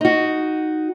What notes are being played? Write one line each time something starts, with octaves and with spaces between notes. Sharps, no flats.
D#4 F#4